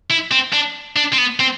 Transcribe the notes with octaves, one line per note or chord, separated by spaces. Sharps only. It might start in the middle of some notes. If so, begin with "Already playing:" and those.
E4
C4
D4
D4
C4
B3
C4